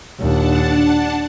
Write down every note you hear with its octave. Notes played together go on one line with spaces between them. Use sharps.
D#2 A#2 D4 F#5 A5